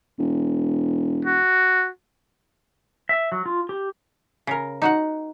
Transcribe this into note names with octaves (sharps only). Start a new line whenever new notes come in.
E1
F#4
E5
F#3
F4
G4
C#3 A#4
D#4 F#4 F#5